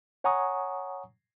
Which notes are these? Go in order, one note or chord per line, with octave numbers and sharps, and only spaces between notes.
C#5 F#5 G#5 A#5 C#6 D#6